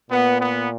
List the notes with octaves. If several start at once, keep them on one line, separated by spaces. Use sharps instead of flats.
A#2 B3
B3